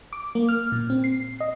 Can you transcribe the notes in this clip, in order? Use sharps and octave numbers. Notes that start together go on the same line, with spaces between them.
D6
A#3
F6
A#2
C4
C7
D#5